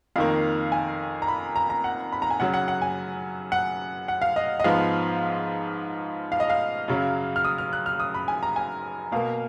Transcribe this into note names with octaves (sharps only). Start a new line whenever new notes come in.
F2 D#3 A#3 F5
G#5
A#5
B5
A#5
A#5
F#5
B5
A#5
G#5
F#2 C#3 F#3 F#5
F#5
F#5
G#5
F#5
F#5
F5
D#5
D#5
G#2 F3 B3 F5
F5
D#5
F5
F#2 C#3 F#3
F6
D#6
F6
F#6
F6
D#6
B5
G#5
A#5
G#5
B2 A#3 F5